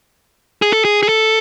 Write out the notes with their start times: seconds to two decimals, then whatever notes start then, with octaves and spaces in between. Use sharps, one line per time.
0.62 G#4
0.73 A4
0.85 G#4
1.03 G#4
1.09 A4